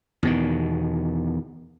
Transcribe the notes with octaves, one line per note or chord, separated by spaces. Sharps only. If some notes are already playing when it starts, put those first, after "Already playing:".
E2 B2 D#3